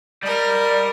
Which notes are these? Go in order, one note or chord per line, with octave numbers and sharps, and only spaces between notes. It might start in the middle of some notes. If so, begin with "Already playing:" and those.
G3 A#4 D5 D#5